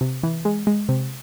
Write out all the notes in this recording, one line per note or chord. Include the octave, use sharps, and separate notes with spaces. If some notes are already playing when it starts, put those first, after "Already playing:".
C3
E3
G#3
G#3
C3